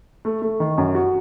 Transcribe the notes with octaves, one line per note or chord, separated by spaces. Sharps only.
A3
A3
D#3
F#2
F#4